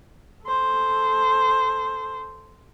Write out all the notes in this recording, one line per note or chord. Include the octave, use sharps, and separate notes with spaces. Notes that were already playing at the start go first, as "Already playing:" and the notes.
A4 C5